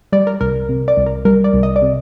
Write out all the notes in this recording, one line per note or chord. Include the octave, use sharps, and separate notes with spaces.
G3 D5
A#4
C2 A#4
C3
D5
C2
A#4
G3 A#4
D5
C2
D#5
D5
C3